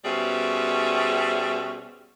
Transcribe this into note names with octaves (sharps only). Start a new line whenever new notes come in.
B2 G3 C#4 G#4 C5 E5